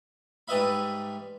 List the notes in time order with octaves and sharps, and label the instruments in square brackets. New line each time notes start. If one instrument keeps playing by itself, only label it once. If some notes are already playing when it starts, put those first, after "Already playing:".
[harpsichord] G#2 G3 B4 D#5 E5 B5